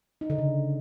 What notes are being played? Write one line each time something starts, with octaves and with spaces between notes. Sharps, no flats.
D#4
D3
C#3